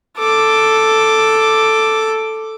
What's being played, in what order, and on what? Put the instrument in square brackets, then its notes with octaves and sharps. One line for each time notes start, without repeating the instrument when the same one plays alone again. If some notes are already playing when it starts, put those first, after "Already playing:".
[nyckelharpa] A4 D6